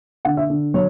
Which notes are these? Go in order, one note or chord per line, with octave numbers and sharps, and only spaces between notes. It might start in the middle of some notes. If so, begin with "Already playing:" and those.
D3 F#5
E5
D3
F#3 C#5